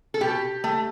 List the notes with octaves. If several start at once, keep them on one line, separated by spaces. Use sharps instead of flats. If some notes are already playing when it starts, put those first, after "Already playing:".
A4
B2 G4
A3